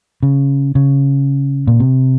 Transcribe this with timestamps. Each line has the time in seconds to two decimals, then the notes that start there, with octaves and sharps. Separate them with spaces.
0.23 C#3
0.75 C#3
1.67 A#2
1.80 C3